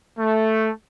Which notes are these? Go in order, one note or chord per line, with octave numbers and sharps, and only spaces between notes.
A3